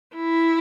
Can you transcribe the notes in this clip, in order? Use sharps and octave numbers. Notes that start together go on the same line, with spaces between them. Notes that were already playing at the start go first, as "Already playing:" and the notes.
E4